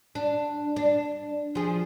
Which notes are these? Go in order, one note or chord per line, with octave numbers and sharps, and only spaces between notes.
D4
D4
F3 G#4